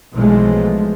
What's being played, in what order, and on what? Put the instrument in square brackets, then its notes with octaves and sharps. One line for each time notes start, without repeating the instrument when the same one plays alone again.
[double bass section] B1 E3 F3 G#3 A3